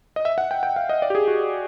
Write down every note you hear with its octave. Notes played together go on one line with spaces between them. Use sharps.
D#5
E5
F#5
G5
G5
F5
D#5
D5
G4
G#4
F#4